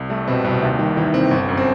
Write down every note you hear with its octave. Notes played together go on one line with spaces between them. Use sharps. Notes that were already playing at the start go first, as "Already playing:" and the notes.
Already playing: C2
G3 A3
B2 C4
C2 B2
D#2 C3
D#3 G3
D#3 E3
C4
G1
F#2
C4